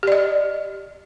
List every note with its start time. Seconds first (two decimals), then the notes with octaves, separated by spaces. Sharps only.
0.03 G4
0.07 D5
0.12 D#5